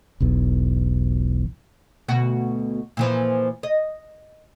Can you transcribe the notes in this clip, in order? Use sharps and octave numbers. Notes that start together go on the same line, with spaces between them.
E1 B1 E2
D2 B2 F#4
A#2 E3 F3
D#5